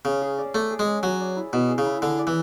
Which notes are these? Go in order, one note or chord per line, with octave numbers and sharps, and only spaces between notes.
C#3 C#4
G#4
D5
A3 D5
G#4
G#3
C#4
F#3 G#4
D5
E4
B2 E4
G#4
C#3
E4
D3 G#4
D5
E3